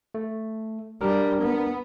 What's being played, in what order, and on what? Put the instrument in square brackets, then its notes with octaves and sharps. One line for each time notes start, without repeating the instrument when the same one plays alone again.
[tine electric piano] A3
[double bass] G3 [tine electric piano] D4 A#4
[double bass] B3